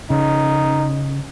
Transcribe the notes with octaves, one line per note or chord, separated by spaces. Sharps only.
C#3 D#4